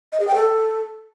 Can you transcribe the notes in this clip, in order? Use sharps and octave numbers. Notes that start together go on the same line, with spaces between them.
D#5
G#4
G5
A4